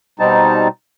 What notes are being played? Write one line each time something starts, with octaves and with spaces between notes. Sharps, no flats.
B2 G3 C4 D#4 A5